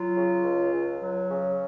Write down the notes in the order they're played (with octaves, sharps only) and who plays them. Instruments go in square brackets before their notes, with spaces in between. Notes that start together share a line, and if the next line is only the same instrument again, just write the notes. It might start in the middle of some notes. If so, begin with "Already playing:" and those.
Already playing: [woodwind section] F#3 F4
C#3
C#2
C#2
F#3
C#3